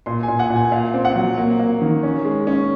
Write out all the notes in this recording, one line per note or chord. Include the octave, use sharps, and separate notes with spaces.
A#2 C6
G#5
A#2
F#5
A#2
G#5
A#2 F5
C4
F#5
F#3
A#3
A#3
D#3
C#4
G#3
C#4